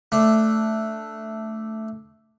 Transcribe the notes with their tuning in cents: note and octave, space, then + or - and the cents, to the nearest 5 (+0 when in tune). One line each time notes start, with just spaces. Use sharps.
A3 +0 D4 +0